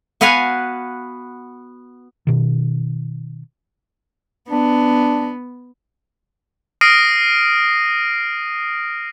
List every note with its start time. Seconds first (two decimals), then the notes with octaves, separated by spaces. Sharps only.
0.21 B3 F#4 B4 F5 F#5 G#5
2.27 B2 D#3
4.50 B3 D4
6.81 D#6 F6 A#6 C7 D7 D#7